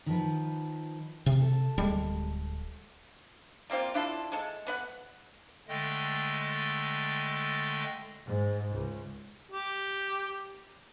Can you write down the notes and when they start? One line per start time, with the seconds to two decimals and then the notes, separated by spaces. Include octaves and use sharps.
0.06 D#3 F3 B4
1.26 C3
1.42 A4
1.78 D1 G3 G#3
3.70 G3 A#3 C4 F4
3.94 D4 E4 F4 A4
4.32 G#3 A4
4.67 B3 B4 F#5
5.68 D3 G#3 A3 D#5 G5
8.28 G#2
8.74 C#2
9.52 G4